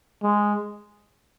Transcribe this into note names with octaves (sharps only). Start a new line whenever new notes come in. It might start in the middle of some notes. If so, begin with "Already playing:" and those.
G#3